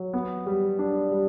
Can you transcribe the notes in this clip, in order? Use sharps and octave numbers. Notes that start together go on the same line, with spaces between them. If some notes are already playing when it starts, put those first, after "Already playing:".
Already playing: F#3
B3
G3
D4
G3